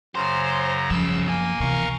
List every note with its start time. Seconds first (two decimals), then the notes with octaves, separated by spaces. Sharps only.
0.15 F#2 C#3 C5 A#5
0.90 C2 F#2 C#3 F3 E6
1.28 B2 A#3 G#5
1.60 C3 E3 A#4 F5 C#6